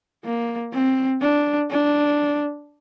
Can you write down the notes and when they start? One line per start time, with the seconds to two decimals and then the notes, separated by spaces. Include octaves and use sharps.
0.24 A#3
0.73 C4
1.21 D4
1.70 D4